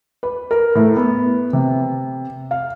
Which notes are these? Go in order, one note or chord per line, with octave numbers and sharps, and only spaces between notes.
B4
A#4
A2
B3
C3
F5